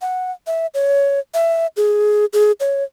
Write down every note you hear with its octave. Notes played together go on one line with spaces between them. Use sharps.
F#5
E5
C#5
E5
G#4
G#4
C#5